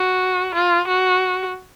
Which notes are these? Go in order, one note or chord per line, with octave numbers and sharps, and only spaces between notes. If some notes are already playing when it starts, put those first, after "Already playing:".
Already playing: F#4
F4
F#4